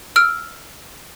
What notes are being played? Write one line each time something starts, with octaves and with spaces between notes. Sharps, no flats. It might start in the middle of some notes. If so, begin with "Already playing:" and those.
E6 F6 D7